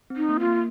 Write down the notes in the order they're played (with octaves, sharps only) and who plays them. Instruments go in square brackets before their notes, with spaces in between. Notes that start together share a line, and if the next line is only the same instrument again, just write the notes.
[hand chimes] C4
[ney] D#4
[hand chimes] A#3
[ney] F4
[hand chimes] A#3